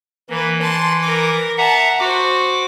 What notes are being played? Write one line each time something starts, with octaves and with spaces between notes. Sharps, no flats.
E3 A#3 B4
A5 C6
A#4 D6
E5 F#5 A5 A#5
F#4 C5 D6